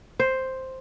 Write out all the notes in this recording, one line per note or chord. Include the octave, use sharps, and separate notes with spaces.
C5